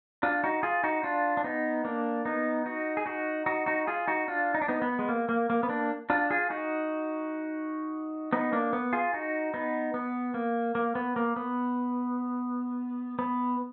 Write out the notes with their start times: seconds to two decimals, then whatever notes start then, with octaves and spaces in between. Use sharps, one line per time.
0.23 D4 F4
0.44 D#4 F#4
0.63 F4 G#4
0.84 D#4 F#4
1.03 D4 F4
1.37 D4
1.44 B3 D#4
1.85 A#3 D4
2.25 B3 D#4
2.66 D#4 F#4
2.97 G#4
3.06 D#4 F#4
3.46 D#4 F#4
3.66 D#4 F#4
3.87 F4 G#4
4.08 D#4 F#4
4.28 D4 F4
4.54 D#4
4.62 D4
4.68 B3 D#4
4.82 B3
4.99 G#3
5.09 A#3
5.29 A#3
5.50 A#3
5.63 B3
5.69 A#3 D4
6.10 D4 F4
6.30 F4 G#4
6.50 D#4 F#4
8.33 B3 D#4
8.53 A#3 D4
8.73 B3
8.93 F4 G#4
9.14 D#4 F#4
9.54 B3 D#4
9.94 B3
10.34 A#3
10.75 A#3
10.95 B3
11.16 A#3
11.36 B3
13.19 B3